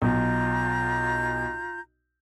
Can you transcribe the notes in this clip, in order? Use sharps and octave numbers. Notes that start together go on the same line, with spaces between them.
B1 F4 A#5 G6